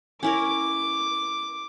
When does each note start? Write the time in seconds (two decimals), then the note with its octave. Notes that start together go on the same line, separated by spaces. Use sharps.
0.23 C#4 E4 A#4 D6